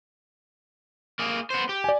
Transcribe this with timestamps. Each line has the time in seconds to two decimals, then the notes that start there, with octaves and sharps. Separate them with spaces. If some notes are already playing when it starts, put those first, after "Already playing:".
1.19 A#3 G#4
1.50 B3 C5
1.69 G4
1.84 D5 G#5